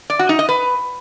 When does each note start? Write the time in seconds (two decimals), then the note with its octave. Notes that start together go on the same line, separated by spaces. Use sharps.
0.10 D5
0.19 F#4
0.29 D#4
0.39 D#5
0.49 B4